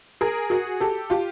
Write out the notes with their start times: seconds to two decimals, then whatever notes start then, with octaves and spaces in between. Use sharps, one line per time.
0.21 G#4 A#4
0.50 F#4 G#4
0.80 G4 A4
1.10 F4 G4